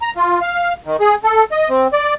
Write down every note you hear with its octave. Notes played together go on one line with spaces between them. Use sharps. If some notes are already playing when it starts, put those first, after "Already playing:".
A#5
F4
F5
D#3
G#4
A4
D#5
C4
D5